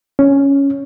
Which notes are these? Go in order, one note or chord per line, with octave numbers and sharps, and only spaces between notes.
C#4